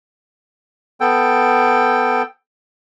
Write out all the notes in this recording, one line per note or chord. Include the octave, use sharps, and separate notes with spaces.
B3 A4 G5